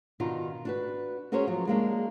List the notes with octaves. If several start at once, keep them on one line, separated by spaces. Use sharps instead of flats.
B2 D#3 D4 D#4 F4
D4 F#4 B4
C#4 F#4 G#4 A#4 C5 C#5
F3 F#3
G#3 A#3 D4